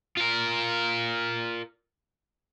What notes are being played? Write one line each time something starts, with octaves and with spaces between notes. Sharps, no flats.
F4 A#4